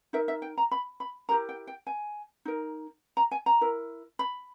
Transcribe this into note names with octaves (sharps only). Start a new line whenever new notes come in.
D#4 A#4 E5
E5
G5
A#5
B5
B5
E4 G4 A#4 A#5
G5
G5
G#5
D#4 A#4
A#5
G#5
A#5
E4 A#4
B5